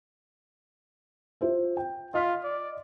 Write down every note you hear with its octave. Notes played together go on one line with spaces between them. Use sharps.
F4 C5 E5
G5
F4 D#5 F6 B6
D5